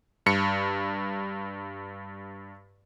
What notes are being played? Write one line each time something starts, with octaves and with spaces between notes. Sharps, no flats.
G2 C#7